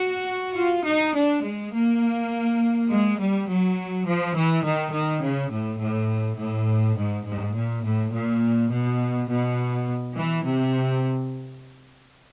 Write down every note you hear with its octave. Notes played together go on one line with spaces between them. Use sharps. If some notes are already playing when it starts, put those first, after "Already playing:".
Already playing: F#4
F4
D#4
D4
G#3
A#3
G#3
G3
F#3
F3
E3
D#3
D#3
C#3
A2
A2
A2
G#2
G#2
A#2
A2
A#2
B2
B2
E3
C3